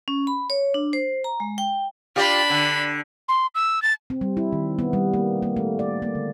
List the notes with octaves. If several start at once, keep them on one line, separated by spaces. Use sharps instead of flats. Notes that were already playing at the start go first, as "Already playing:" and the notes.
C#4
B5
C#5
D4
C5
A#5
G#3
G5
D4 F4 G4 D5 B5
D3
C6
E6
A6
C4
G3
E4
D#3
B3
G3
A#3
A#3
A3
D5
A#3
D3